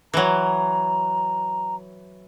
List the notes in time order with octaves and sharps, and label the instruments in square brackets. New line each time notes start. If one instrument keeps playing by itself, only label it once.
[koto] E3 F#3 [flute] A#5